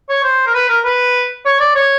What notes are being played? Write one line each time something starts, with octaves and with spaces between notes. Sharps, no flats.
C#5
C5
A#4
B4
A#4
B4
C#5
D5
C#5